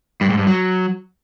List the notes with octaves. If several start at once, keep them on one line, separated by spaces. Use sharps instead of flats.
G2
G#2
G2
F#3